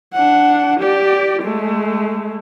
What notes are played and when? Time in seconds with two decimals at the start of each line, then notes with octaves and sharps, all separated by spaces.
0.13 D4 F#5
0.80 G4 D5
1.43 G#3 A3